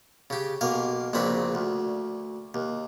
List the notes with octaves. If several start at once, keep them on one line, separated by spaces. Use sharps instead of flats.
C#3 G4
B1 A#3 F5
A#1 A#2 C#3 C4 B4
D2
D#2